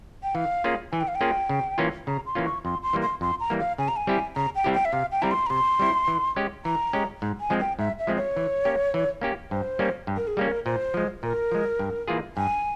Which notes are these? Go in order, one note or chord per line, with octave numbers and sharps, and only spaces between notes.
G5
E3 F5
A#3 C#4 F4 G#4
E3 G#5
G5
F5
G5
A#3 C#4 F4 G#4
C#3
E3 A#3 C#4 F4
C#3 A#5
C6
E3 A#3 C#4 F4
C#6
F2 C6
C6
E3 G3 A#3
C6
F2 C6
A#5
E3 G3 A#3
F5
C#3 G#5
A#5
G#5
G3 C4 E4 G4
C#3 A#5
G5
G3 C4 E4 G4
G5
E5
C3 F5
G5
G3 C4 E4 A#5
C6
A#5
C3 C6
G3 C4 E4
E3
G#3 C#4 G4
E3 A#5
G#3 C#4 G4
G#2
G#5
F3 G#3 C4
G5
G#2 E5
E5
F3 G#3 C4
C#5
E3
A#3 C#4 G4
E3
A#3 C#4 G4
G2 C5
G3 A#3 C#4
G2
A#4
G#4
G3 A#3 C#4
A#4
A#2 C5
F3 G#3
A#2 A#4
F3 G#3
G2
E3 A#3 F4 G#4
G2 G#5